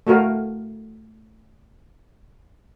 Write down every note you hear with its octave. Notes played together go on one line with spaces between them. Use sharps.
A3 F#4 A#4 F5